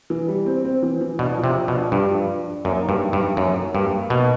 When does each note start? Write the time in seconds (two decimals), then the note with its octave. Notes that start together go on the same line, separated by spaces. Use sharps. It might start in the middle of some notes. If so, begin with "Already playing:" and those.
0.10 E3
0.28 G3
0.46 C4
0.65 C4
0.82 E3
1.01 E3
1.19 B2 D4
1.38 F3
1.44 C3
1.56 F3
1.68 B2
1.74 D4
1.92 G2 D4
2.10 F3
2.28 D4
2.47 D4
2.65 F#2 A#3
2.83 D#4
2.89 G2
3.01 D#4
3.13 G2
3.20 D#4
3.37 F#2 A#3
3.55 A#3
3.74 G2 D#4
3.92 A#3
4.10 B2 A#3